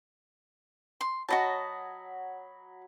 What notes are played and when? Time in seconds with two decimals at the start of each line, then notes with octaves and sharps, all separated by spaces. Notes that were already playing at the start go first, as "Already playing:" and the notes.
1.01 C6
1.28 F#3 F#4 D#5 A5 B5